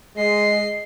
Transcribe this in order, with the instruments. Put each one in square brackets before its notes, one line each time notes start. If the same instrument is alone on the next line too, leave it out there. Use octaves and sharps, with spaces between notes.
[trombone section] G#3 [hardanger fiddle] D#5 [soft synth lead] C7